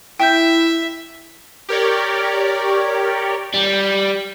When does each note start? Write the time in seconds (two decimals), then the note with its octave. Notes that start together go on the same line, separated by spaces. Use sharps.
0.20 E4 E5 G5 G6
1.69 G4 A#4 C#5 D5
3.54 G3